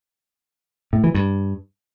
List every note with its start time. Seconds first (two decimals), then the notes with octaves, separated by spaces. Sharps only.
0.93 A2
1.04 E3
1.15 G2